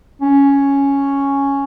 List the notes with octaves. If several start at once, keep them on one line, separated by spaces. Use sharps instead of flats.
C#4